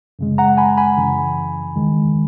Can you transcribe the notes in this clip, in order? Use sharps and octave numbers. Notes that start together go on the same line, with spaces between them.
F#2 C#3 G#3
F#5 A#5
G#5 B5
G#5 B5
F#2 C#3 E3
E2 D#3 G#3